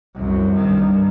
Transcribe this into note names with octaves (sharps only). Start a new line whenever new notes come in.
C2 F#2
G2 D#3